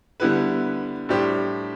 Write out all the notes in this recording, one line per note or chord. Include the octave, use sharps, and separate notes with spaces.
D3 G3 B3 E4 B4
A2 G3 D4 G4 C5